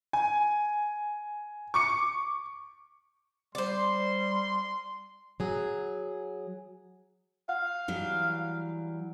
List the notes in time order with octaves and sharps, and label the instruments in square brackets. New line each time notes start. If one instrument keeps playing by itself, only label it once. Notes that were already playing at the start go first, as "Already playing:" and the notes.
[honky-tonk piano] G#5
C#6 D6 C#7
[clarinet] G3 [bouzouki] C5 D5 [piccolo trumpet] C6
[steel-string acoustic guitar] F#3 G#4
[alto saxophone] F5 [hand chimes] F#5
[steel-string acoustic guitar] E3 F#3 G3